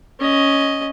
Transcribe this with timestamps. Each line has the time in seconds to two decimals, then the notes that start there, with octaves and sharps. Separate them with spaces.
0.19 C#4 D#5